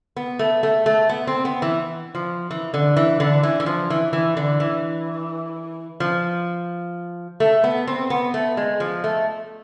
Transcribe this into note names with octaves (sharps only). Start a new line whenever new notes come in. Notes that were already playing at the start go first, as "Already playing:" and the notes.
B3
A3
A3
A3
B3
C4
B3
E3
F3
E3
D3
E3
D3
E3
E3
F3
E3
E3
D3
E3
F3
A3
B3
C4
B3
A3
G#3
F3
A3